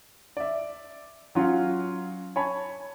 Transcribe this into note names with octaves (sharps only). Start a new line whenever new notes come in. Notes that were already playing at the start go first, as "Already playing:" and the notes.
D5 E5
F#3 C#4 F4
C#5 G#5 A5 B5